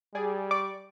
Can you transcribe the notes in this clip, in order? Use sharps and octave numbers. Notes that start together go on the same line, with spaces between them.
G3 G#4 D5 G#5
D5 C#6 D6